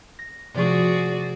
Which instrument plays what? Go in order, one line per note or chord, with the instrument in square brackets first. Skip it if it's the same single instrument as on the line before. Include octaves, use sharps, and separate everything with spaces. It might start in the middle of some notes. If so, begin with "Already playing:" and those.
[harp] A#6
[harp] C3 F3 C#6 [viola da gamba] F#4 G#4 D5